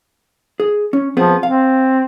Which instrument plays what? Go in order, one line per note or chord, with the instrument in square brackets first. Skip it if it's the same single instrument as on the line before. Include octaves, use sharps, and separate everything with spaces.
[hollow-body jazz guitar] G#4
C#4
[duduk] F3 [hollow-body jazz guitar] B3 C4 G#4
[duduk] C4 [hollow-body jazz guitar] F5